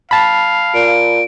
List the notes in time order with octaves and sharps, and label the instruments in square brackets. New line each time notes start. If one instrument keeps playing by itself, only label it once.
[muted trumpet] F5 [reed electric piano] A5 B5
[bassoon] A#2 [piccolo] D7